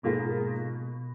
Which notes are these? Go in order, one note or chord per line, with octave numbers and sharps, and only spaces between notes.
G#2 B2 F3 A#3 F4 G#4